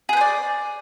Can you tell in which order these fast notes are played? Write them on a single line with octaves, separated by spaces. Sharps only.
G#4 B4 C5 D5